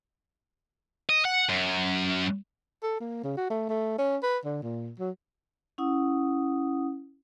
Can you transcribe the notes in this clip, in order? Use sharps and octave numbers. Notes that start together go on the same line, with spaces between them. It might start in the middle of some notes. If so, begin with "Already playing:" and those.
D#5
F#5
F#2
A4
A#3
C#3
F#4
A3
A3
C#4
B4
D3
A#2
F#3
C#4 E4 F#5 D#6